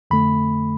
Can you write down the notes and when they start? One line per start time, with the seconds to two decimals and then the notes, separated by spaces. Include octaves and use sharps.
0.11 F2 D3 A3 B5